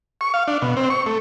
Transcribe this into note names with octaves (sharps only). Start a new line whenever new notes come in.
C#6
F5
D4
B2
C4
C#6
A3